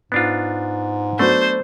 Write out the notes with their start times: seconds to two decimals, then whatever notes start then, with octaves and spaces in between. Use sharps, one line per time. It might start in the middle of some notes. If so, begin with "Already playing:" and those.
0.12 G#2 B3 D4 F4
1.19 F#3 A3 B3 D4 C5